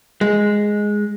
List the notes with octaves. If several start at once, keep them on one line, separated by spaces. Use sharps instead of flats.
G#3